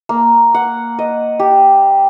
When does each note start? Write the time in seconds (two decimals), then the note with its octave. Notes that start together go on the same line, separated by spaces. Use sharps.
0.09 A#3
0.54 F#5
0.99 D#5
1.40 G4